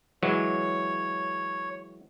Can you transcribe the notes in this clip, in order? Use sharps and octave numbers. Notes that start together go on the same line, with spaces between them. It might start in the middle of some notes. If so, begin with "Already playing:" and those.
E3 F#3 G#3 C#5